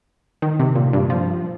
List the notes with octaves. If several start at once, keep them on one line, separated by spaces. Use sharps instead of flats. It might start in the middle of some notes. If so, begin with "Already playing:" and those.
D#3
C3
A#2
G2
F3